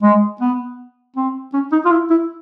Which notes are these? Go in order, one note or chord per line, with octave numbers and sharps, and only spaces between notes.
G#3
B3
C4
C#4
D#4
F4
E4
E4